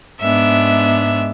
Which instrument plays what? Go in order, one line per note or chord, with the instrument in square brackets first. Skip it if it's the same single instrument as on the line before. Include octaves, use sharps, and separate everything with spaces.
[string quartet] G#2 G#3 B3 D4 E5